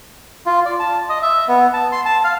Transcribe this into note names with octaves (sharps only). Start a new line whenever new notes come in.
F4
D5
A5
D#5
E5
B3
A5
C6
A5
F5